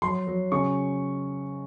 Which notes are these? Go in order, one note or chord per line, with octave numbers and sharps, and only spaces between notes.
F#3 C6
F#3
C#3 C#6